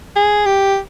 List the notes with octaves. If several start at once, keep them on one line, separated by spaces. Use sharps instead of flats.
G#4
G4